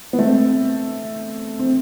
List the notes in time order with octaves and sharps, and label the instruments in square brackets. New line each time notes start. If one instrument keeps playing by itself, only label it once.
[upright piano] B3
A3 C4
C4